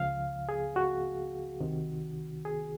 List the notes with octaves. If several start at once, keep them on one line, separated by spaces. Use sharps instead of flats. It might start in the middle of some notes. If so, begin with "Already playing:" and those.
Already playing: C#2 C#3 F3 F5
G#4
F#4
C2 C3 D#3
G#4